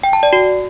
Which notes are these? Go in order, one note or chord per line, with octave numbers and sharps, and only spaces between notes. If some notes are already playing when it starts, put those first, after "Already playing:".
G5
A5
D5
F#4